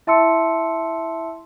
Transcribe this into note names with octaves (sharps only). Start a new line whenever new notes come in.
E4 E5 A5 C6 E6 C#7